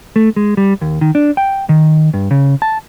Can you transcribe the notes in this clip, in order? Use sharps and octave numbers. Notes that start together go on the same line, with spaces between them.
A3
G#3
G3
D#2
D#3
D4
G5
D#3
G2
C#3
A5